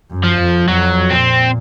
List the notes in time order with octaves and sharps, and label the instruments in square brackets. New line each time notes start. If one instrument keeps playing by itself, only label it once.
[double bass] F#2
[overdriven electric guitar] F3
[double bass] F2
[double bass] F2 [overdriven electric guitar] F#3
[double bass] A#2 [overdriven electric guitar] C4